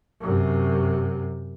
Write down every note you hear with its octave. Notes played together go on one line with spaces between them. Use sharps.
F#2 C3